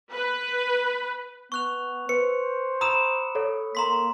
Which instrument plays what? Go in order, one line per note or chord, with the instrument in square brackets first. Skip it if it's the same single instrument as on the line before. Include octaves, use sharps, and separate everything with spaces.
[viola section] B4
[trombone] B3 [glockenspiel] C#6 F#6 F7
[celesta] B4 [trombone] C5 [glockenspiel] C#7
[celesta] A#5 E7 [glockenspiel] B5 D#6 E6
[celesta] A4 C#5
[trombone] A#3 [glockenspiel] A#5 C6 B6